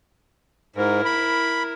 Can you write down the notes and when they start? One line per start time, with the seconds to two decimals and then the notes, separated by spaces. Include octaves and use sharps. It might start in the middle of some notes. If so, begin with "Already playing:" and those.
0.76 G#2 E4 A#4
1.05 B5